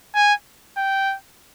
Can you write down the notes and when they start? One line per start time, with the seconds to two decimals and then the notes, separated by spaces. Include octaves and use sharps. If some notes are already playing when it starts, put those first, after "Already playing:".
0.15 G#5
0.78 G5